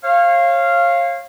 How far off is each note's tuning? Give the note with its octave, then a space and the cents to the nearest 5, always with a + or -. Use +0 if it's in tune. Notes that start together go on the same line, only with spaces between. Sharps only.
C#5 -35 F5 -10